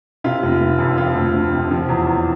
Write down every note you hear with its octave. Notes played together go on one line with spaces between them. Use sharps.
C3 F4
F1
F1
F2
F3 F4
D2
D2
C3
F3
E2
E2